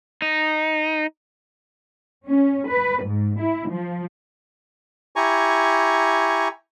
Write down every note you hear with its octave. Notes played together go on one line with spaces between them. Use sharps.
D#4
C#4
B4
G#2
E4
F3
E4 G4 G#5 A#5 C#6